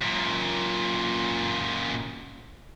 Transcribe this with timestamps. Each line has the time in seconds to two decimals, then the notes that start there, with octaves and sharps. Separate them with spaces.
0.02 F#2 A#2